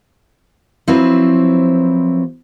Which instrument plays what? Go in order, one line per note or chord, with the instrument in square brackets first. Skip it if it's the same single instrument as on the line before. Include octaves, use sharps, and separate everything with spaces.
[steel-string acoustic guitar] F3 F#3 C4 E4 B4